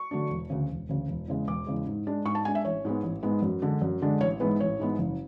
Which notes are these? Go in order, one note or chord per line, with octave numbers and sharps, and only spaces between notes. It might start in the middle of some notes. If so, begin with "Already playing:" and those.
Already playing: C#6
D3 F#3 A3 D4
E1
D2 C#3
E1
D2 C#3
E1
E2 C#3 G#3
E1 D6
E2 C#3 G#3
G#2
G#3 D4
G#2 C#6
A5
G#3 D4 G#5
E5
A1 C#5
G#2 G#3 B3
A1
G#2 G#3 B3
F#2
D3 G#3 D4
F#2
D3 G#3 D4
A1 C#5
G#2 E3 G#3 B3 B4
A1 C#5
G#2 E3 G#3 B3
F#1